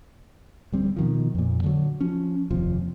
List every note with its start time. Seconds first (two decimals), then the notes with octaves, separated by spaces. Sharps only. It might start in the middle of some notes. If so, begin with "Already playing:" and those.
0.72 D1 G3 C4
0.96 B2 D#3 F3
1.35 F2 A#2
1.64 D3 F#3
2.00 F3 C#4
2.51 F1 D#2 C3 F3